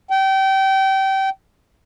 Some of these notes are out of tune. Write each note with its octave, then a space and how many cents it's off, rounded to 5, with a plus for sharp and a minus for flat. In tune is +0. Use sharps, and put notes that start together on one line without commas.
G5 -25